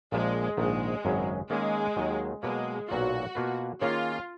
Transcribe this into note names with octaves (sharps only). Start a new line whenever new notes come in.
A#1 A#2 F3 G#3
A#1 G#2 D#3 G#3
G#1 F#2 C#3 F#3 C#4
D#3 G#3 A#3 C#4
D#2 D#3 F#3
B2 F#3 G#3 A#3
B1 A#2 F#3 B3 F4 F#4
B2 A#3 F4 B4
D#3 A#3 C#4 F4 G#4 C#5